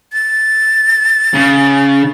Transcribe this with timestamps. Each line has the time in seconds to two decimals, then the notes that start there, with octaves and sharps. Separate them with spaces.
0.13 A6
1.34 C#3